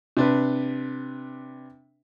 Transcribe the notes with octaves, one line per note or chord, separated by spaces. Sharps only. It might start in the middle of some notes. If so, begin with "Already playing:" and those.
C3 D4 B4